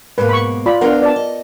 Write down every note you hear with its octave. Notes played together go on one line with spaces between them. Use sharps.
G#2 B2 A#3 B4
B5 C#6
F4 D5 B5
B3 D4 F4 A#4 F#5 A#5
D5 A5
D#5